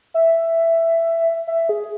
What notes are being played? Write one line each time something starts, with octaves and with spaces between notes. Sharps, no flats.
E5
E5
G#4